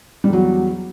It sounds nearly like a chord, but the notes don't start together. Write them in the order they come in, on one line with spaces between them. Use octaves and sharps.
G3 E2 F#3